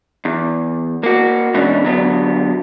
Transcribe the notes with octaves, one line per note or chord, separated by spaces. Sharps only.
E2
A#3 F#4
B2 E3 G#3 C#4 D4
D3 F#3 B3